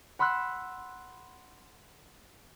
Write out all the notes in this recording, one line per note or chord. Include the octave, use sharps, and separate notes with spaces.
F#5 B5 C6 E6 F#6